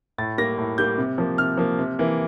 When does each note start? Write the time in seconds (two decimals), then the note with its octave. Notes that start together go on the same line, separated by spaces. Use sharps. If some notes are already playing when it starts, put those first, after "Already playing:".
0.18 A2 A6
0.38 G3 A#3 A#6
0.58 A2
0.78 G3 A#3 G6
0.98 C3
1.18 F3 A#3
1.38 C3 F6
1.58 F3 A#3
1.79 C3
1.99 E3 A#3